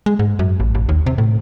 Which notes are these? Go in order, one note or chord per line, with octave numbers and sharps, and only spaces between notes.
G#3
G#2
F#2
A1
A1
D#2
C3
A2